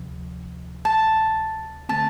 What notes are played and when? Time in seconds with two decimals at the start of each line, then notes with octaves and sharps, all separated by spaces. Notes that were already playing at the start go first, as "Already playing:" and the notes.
Already playing: D2 C3 F3
0.85 A5
1.89 D3 A3 C4 A5